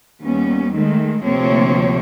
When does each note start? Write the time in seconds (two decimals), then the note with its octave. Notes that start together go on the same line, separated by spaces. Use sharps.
0.22 D#2 G3 B3 C#4
0.74 D#3 G#3 A3
1.23 D2 C3 F3 A#3 C4 C#5